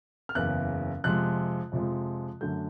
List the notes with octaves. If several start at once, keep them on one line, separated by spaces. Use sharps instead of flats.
F6
F#1 E2 C#3 F#6
F2 C3 F3 G#3 F#6
F2 C3 F3 G#3
F#2 D3 F#3 A3 G6